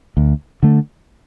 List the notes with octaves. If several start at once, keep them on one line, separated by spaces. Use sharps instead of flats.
D2
D3 A3